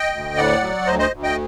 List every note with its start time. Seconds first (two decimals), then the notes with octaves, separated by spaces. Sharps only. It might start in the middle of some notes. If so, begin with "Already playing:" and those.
Already playing: D#5 G5
0.13 D2
0.37 A2 D5 F#5
0.62 F#3
0.87 D2 C5 D#5
0.99 C5 D#5
1.11 D2
1.23 D#5 G5